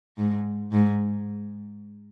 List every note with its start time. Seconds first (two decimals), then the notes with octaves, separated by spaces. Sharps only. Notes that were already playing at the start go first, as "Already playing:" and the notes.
0.17 G#2
0.72 G#2